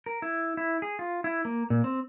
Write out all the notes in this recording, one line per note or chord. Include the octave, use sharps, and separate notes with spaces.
A#4
E4
E4
G#4
F4
E4
A#3
A#2
C4